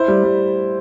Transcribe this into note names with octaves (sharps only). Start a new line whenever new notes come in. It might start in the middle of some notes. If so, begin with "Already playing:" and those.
Already playing: E4 C5
G3
G3